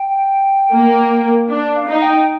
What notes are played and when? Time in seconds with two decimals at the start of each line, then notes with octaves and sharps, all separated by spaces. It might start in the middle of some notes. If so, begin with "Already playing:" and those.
Already playing: G5
0.71 A#3
1.50 D4
1.76 F5
1.89 D#4
2.02 G5